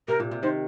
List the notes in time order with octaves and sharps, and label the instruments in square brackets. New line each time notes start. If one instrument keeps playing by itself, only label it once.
[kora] C3 [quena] A#4
[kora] A#2
C3
[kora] D#3 [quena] C5